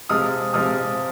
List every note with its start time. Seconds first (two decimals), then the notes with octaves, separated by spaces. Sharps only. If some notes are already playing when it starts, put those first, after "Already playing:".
0.09 C3 F3 G#3 D#6 F6
0.53 C3 F3 G#3 D#6 F6